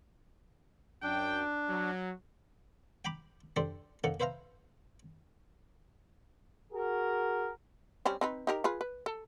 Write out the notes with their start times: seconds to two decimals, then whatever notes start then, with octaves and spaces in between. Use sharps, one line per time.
1.03 F#2 D4 G5
1.69 F#3
3.05 G5 A#5 B5 D6
3.56 D4 G4 A4 C5 D5
4.04 A#3 C#4 D#4 A4 F#5
4.20 B4 C5 E5 F5 A#5
6.73 F#4 G#4 A#4
8.05 G3 C4 C#4
8.21 C4 D#4 B4
8.47 D#4 G4 A#4
8.64 F4 G#4 B4
8.81 B4
9.06 A4